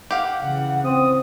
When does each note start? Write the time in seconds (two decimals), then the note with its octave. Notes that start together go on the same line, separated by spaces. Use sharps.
0.11 G4 F5 F#5
0.42 C#3 E3 F#5
0.84 C4 D#6